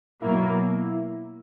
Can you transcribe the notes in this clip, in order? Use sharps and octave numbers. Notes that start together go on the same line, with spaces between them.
B2 F#3 A#3 E4